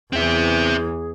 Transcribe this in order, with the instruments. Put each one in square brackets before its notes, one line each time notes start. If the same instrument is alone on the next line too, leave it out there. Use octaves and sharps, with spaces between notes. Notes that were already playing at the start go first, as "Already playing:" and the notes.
[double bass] E2 E3 [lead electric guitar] C4 E5 [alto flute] G#4